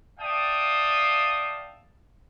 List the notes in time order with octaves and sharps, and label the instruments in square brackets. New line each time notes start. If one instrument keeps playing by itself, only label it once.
[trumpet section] D5 E5 F5 G5 A5 D#6